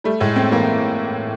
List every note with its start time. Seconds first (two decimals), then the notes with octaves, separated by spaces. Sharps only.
0.04 G3 A3
0.20 A2 G#3
0.36 A3 C4
0.52 E3 A#3